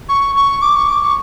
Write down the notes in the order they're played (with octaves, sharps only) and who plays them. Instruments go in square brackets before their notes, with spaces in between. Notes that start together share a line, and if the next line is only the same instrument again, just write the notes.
[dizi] C#6
C#6
D6
C#6
D6
C#6